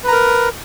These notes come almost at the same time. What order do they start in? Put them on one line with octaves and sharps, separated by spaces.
B4 A#5 A#4